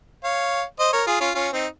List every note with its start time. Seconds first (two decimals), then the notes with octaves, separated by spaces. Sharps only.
0.24 C#5 F5
0.79 C5 D#5
0.93 A#4 C#5
1.07 F4 G#4
1.20 C#4 F4
1.35 C#4 F4
1.53 C4 D#4